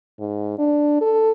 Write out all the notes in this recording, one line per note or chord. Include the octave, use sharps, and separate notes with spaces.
G#2
D4
A4